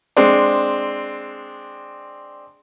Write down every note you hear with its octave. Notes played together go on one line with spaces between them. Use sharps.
G#3 C4 D4